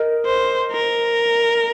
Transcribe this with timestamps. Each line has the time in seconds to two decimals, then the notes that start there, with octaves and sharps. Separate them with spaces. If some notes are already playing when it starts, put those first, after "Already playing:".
Already playing: A#4 D#5
0.26 C5
0.72 A#4